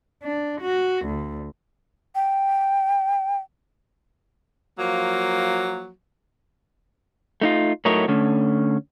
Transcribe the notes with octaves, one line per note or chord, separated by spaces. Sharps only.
D4
F#4
D2
G5
F3 F#3 A#3
A3 D#4 F4
A2 F#3 A3 D#4 A#4 C#5
D3 A3 C#4